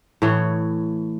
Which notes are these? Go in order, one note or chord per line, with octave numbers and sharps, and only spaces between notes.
A2 E3 C#5